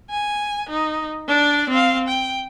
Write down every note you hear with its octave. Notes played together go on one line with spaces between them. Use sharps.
G#5
D#4
D4 D5
C4 F5
G5